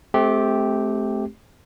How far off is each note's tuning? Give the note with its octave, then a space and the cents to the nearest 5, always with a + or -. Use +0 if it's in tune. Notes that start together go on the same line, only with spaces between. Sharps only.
A3 -30 C4 +0 G4 +0